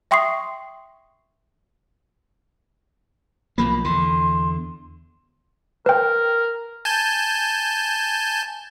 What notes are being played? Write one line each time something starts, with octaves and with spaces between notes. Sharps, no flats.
E5 G5 C6 C#6 D#6 C7
B1 F3 A#3 B5
E2 D3 C6
A#4 B4 G5
G#5 A5 G6